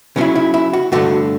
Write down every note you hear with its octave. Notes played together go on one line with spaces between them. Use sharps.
C#3 F#3 C#4 E4
E4
E4
F#4
G2 D3 A3 F#4